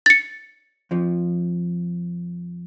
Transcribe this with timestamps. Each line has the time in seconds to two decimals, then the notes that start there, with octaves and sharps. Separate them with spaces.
0.06 A6 C#7
0.91 F2 F3